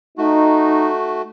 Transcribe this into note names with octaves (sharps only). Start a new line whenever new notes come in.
A3 D#4 F#4